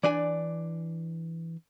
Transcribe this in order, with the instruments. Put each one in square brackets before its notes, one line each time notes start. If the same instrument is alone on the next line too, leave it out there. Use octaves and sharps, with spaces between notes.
[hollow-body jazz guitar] E3 D4 G#5 [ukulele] D5